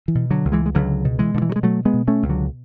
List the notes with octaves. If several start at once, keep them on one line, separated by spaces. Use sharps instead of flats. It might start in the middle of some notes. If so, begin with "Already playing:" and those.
E3
B2
D3 F#3
C#2
E3 G#3
G#3
C#2 D3 F#3
B2
E3 G#3
B2 D3
E3
F#3
G#3
B2 F#3 A3
G#3 B3
B2
A3 C#4
C#2
D3 F#3